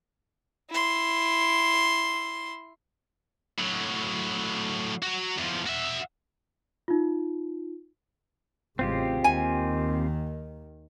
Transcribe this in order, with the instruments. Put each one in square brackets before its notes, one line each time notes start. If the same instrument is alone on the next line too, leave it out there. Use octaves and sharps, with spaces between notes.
[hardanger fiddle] E4 C6
[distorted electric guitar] A2 F#3
F#3 F#4
E2 F3
F#4 E5
[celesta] D#4 F4
[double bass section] A1 C#3 G#3 [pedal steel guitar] C4 F4 G4
[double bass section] D#2 D#3 [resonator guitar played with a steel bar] G#5